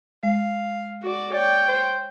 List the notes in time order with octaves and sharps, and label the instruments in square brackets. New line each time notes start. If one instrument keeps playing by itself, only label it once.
[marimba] G#3 [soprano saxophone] F5
[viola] F#4 D5
[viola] C#5 G5 [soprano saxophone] D5
[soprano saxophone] C5